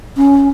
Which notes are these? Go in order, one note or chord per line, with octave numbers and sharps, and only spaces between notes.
C#4